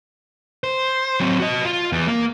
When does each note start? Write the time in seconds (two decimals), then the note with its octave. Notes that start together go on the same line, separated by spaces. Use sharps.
0.64 C5
1.20 F#3 C4
1.40 F#4 D#5
1.65 F4
1.92 E2
2.07 A#3